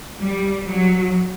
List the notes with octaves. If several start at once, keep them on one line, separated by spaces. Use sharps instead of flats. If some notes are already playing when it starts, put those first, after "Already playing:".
G3
F#3